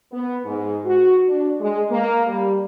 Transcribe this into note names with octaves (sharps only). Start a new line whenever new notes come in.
B3
G#2
F#4
D4
G#3
A#3
G3